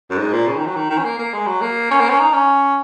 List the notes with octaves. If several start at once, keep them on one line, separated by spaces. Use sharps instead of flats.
F#2
G#2
A#2
C#3
D#3
F#3
D#3
D#3
C#4
A#3
A#3
G#3
F#3
A#3
C#4
A#3
C#4
D#4
C#4